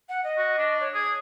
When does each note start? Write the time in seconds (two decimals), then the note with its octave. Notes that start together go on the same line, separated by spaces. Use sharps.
0.09 F#5
0.24 D#5
0.37 F#4
0.58 D4
0.80 C#5
0.94 G#4 G#6